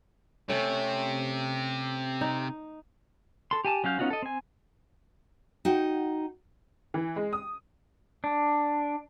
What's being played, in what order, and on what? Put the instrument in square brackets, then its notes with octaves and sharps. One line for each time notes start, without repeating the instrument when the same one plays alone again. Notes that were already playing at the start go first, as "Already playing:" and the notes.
[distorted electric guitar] C3 [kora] A3 C#4
[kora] D#4
[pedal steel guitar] A4 C6
G4 G#5 A5 D6
F#3 C#4 F5 G6
B3 C#4 D#4 F4 F#4
A4 D#5
C4 G#5
[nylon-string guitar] D#4 F#4 G5
[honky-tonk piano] E3
G#3
D#6
[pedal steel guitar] D4